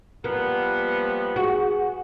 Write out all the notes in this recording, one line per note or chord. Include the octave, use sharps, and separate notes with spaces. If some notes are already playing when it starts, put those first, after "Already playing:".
F3 G3 A#3 B3
F#4 G#4